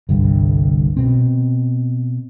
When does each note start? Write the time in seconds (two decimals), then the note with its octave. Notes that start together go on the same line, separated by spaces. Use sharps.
0.09 G1 C2 G2
0.97 B2 C4